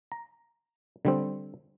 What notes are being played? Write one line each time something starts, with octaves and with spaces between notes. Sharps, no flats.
A#5
D3 G3 C4